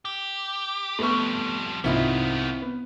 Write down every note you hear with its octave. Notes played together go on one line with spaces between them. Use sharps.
G4
F2 G3 A3 B3 C#6
C2 G#2 D#3 B3 C4 E4 F4
B3